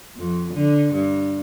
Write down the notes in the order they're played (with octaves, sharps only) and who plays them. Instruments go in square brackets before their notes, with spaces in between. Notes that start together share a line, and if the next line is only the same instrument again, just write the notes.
[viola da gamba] F2
D3
G2